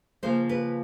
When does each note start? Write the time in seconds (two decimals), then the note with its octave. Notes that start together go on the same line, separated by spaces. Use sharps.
0.23 C#3 F3 A#3 C5
0.49 B4